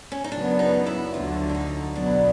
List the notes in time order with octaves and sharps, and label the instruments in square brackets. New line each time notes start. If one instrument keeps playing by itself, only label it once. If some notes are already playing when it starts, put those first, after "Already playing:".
[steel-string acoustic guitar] C#4
D#4
[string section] F#2 C#3 F#3 B3 [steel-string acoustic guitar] D4
[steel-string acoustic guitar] D#4
E4
[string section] D2 D3 F#3 [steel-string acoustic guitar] F4
[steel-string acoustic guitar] D4
D#4
[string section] B1 B2 F#3 B3 [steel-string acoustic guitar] D4